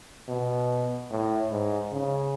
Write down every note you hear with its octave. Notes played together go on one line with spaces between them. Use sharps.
B2
A2
G#2
C#3